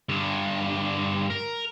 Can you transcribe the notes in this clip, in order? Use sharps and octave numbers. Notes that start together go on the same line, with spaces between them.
G2 D3
A#4